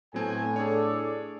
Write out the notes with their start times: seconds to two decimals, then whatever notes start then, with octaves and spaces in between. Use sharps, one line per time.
0.14 A2 F#3 B3 C4 A4 G#5
0.56 D4 G#4 A4 C#5 D5